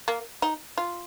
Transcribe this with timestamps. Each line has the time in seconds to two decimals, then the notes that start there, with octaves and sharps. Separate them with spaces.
0.08 A#3
0.42 D#4
0.78 F4